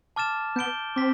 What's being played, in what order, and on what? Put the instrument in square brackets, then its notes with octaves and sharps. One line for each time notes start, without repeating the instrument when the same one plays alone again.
[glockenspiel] A5 D6 F6 A6 E7
[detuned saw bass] B3 [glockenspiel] G6 D7 G7
[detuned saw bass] C4 [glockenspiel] D6 F6 B6